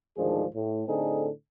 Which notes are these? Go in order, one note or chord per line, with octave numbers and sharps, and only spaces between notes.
D2 G#2 D#3 F3 D4 G#4
A2
A2 D3 C4 D#4 G#4 A4